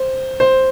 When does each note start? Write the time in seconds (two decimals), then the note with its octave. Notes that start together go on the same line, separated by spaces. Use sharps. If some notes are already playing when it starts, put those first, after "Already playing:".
Already playing: C5
0.40 C5